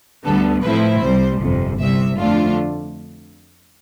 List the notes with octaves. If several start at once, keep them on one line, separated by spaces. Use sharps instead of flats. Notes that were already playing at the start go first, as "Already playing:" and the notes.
D2 D3 G3 B3 A4
A2 F3 A3 C4 E4 B4
C2 C3 G3 C5
G1 F2 C3
C2 C3 G3 E5
F2 D3 A3 D4 F4